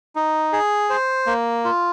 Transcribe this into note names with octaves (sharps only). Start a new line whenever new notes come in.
D#4
G#4
C5
A#3
F4